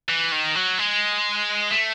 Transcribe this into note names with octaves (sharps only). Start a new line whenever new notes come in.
E3
D#3
F#3
G#3
A3